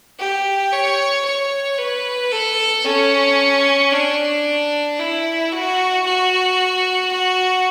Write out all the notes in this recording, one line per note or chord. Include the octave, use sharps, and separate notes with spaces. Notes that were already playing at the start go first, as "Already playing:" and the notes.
G4
C#5
C#5
B4
A4
C#4
D4
E4
F#4
F#4
F#4